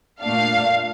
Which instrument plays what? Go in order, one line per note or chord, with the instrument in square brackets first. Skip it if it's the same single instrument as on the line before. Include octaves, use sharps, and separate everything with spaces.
[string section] A#2 A3 D4 F5